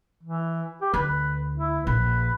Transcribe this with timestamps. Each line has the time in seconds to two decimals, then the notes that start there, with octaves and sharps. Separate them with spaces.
0.23 E3
0.81 G4
0.94 D2 B4
1.56 E4
1.87 A#1 B4